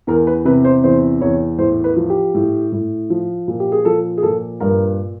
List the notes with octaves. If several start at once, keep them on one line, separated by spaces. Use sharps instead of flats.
E2 A#4
B4
C3 B4
C5
E2 C5
E2 C#5
A2 C5
B4
F3
G4
A2
A2
F3
A#2
G4
G#4
F3 A4
G#4
A#2 A4
G2 A#4